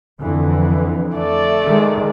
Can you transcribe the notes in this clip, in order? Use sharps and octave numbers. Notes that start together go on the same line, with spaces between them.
F2 D3 E3
A3 D5
D#3 G#3